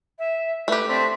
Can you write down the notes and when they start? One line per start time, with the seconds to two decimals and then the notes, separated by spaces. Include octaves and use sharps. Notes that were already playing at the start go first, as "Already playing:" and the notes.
0.19 E5
0.68 A3 G4 B4
0.89 C4 D4 C5 B6